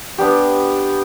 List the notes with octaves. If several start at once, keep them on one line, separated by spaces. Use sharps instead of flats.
B3 D4 G4